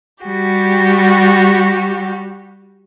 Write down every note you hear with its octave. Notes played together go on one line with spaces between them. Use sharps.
G3 F#4 G4